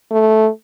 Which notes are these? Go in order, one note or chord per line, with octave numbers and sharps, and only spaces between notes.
A3